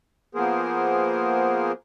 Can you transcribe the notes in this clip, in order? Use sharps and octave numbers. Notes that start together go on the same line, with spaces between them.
F3 A#3 B3 G#4 A#4 C5